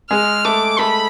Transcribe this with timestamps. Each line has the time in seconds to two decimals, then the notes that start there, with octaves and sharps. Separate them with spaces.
0.10 G#3 G#4 F6
0.45 A3 A4 D6
0.79 A3 A4 B5